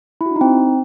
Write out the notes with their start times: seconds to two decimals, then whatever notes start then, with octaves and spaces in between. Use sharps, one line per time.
0.21 E4
0.26 F#4
0.31 D4
0.36 D#4
0.41 C4